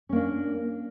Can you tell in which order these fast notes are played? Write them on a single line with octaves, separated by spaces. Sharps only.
C#4 A#3 D4